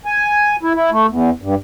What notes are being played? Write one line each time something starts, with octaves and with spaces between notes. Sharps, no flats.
G#5
E4
E4
A3
E2
G2